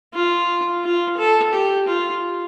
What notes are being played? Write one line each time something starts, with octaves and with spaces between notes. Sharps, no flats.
F4
F4
A4
G4
F4